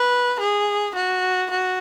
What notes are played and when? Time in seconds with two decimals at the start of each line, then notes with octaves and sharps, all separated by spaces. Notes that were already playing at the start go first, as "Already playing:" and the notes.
Already playing: B4
0.40 G#4
0.95 F#4
1.50 F#4